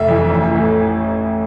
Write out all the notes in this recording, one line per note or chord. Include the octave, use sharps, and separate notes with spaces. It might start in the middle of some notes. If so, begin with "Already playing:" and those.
Already playing: F1 E5
F2 E3
A1
A2 E3